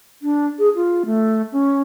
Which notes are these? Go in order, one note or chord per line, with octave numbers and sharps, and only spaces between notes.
D4
G#4
F4
A3
C#4